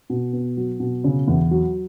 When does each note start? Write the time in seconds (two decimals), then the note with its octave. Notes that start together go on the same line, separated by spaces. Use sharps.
0.10 B2
0.33 B3
0.57 F#3
0.80 B2
1.04 C#3
1.28 E2
1.51 F#3